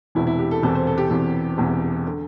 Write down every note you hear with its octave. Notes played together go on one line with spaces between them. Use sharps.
E1 E2 C3 E3 E4
E4
G4
A4
E1 E2 C3 E3 A4
C5
A4
G4
E1 E2 C3 E3
E1 E2 C3 E3
D3